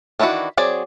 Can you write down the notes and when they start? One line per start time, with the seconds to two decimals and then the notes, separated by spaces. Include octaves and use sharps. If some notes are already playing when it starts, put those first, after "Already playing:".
0.19 D#3 E3 D4 E4 F#4
0.57 F#3 C4 G#4 D5